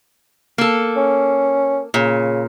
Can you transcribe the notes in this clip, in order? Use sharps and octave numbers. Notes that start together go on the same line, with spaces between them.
A#3 A4
C#4
A#2 C#3